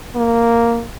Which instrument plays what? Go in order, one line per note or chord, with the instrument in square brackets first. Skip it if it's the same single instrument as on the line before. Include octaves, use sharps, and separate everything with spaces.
[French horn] A#3